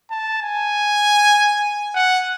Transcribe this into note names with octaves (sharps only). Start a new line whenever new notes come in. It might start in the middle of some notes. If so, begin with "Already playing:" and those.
A5
G#5
F#5